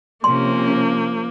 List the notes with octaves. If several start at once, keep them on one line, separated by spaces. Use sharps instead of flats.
C3 F3 A#3 C#4 C6